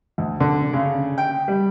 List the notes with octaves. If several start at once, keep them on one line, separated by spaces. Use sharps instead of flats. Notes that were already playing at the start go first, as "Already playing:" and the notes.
D2
D3
C#3
G5
G3